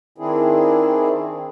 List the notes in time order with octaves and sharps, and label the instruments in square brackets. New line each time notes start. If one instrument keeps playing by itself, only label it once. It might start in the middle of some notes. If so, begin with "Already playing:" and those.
[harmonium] D#3 C4 D4 E4 G#4